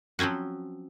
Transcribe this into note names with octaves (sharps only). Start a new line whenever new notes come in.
F3 F#3 C4 C#4 F#4